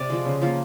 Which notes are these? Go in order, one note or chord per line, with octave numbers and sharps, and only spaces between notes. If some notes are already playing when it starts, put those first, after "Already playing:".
Already playing: C3 C4 D5
F3 G#3
C#3
F3 A#3